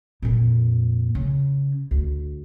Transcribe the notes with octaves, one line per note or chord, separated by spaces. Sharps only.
F2 A#2
C#3
D2